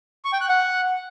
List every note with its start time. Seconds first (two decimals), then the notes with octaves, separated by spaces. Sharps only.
0.25 C#6
0.33 G5
0.41 F#6
0.49 F#5